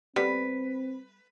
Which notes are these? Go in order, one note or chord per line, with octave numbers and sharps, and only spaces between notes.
G3 B3 C4 B4